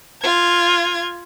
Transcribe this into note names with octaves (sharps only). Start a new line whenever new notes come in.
F4 G#6